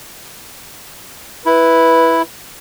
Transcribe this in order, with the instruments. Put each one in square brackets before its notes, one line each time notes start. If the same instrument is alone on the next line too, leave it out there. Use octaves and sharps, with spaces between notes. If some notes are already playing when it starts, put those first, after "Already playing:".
[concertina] E4 [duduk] B4